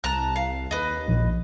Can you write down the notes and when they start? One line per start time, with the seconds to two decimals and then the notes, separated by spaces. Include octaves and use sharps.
0.04 C2 A5 A#5 F#6
0.36 F5
0.71 D#2 B4 D#5
1.08 A#1